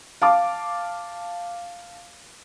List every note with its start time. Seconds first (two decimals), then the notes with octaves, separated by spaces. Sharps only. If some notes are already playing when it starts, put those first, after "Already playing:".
0.22 F5 A5 D6